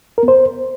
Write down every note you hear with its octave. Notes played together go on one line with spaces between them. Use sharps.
A#4
B3
C5